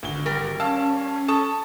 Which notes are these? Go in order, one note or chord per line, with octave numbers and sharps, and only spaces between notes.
G#1 D2 G7
G3 A#4
C#4 F5 A5 E6
A4 A5 C#6 D#6